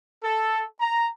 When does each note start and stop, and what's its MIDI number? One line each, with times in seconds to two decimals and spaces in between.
0.23 0.64 69
0.80 1.08 82